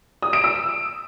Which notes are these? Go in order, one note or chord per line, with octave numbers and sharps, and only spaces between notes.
D#6
D7
E6